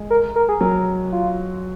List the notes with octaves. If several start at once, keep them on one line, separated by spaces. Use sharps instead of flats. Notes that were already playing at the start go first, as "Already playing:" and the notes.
Already playing: G#3
A#4
A#4
G#4
F#3 A#4
F4